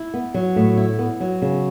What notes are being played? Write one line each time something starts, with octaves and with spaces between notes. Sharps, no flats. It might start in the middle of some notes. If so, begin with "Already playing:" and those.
Already playing: E4
B3
F#3
A2
E4
B3
F#3
C#3